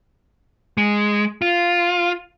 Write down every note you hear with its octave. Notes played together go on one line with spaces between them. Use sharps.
G#3
F4